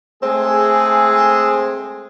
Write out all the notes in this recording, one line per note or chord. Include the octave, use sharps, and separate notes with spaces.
G#3 A3 C4 G#4